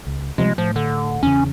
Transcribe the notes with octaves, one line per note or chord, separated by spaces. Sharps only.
C#2
C3 F3 G3 G#3
A2 F3
D3
E2 C#3 C#4